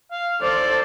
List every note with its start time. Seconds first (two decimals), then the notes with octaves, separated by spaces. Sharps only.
0.12 F5
0.41 A4 C5 D5